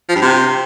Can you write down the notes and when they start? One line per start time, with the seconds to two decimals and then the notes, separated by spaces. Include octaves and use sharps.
0.09 F3
0.15 G2
0.22 C3